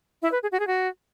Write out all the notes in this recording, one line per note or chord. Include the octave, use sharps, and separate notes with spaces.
E4 E5
B4
G#4
F#4
G#4
F#4